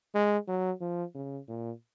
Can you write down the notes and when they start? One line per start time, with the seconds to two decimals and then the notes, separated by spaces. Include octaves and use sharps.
0.15 G#3
0.48 F#3
0.81 F3
1.15 C#3
1.48 A#2